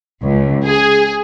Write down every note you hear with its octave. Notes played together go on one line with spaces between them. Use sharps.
C#2
G#4